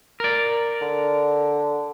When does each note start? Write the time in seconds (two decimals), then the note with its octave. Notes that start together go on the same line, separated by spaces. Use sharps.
0.20 A#4 D5
0.82 D3